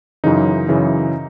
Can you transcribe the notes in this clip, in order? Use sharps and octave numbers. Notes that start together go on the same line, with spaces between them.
F#2 C#3 E3 D#4
F#2 C#3 E3